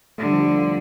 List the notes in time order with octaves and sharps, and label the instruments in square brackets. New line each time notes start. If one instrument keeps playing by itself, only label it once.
[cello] D3 [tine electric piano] A3
[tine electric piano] G3
F3
G3
F4